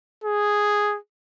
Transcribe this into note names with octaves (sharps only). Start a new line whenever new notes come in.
G#4